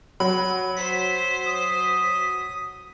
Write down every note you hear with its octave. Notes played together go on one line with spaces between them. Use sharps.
F#3 B5
C5 B6
D#6